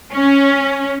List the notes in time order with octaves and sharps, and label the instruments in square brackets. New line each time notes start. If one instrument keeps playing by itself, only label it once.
[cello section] C#4